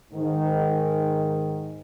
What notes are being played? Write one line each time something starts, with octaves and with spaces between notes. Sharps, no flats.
G#2 D#3